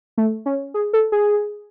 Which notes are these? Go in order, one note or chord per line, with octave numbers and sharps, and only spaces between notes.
A3
C#4
G#4
A4
G#4